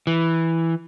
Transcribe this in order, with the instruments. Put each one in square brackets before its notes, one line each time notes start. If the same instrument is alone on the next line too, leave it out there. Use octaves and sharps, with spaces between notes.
[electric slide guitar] E3